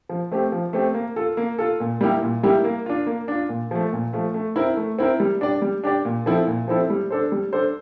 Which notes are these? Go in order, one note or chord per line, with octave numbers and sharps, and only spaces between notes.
F3
A3 C4 G4
F3
A3 C4 G4
A#3
F4 A4
A#3
F4 A4
A#2
G3 A#3 E4 G4
A#2
G3 A#3 E4 G4
A#3
D4 F4
A#3
D4 F4
A#2
F3 A3
A#2
F3 A3
A3
C4 E4 A#4
A3
C4 E4 A#4
G3
D4 G4 D5
G3
D4 G4 D5
A#2
F3 C4 E4 A4
A#2
F3 C4 E4 A4
G3
D4 A4 C5
G3
D4 A4 C5